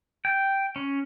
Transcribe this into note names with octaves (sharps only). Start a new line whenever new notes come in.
G5
C#4